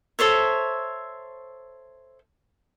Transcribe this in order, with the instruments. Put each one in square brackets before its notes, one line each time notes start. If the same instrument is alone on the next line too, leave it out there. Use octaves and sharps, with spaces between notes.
[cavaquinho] A4 C5 C#5 E5